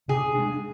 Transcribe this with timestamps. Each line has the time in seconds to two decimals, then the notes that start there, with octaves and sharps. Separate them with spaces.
0.08 C3 G#4
0.35 G#3 D4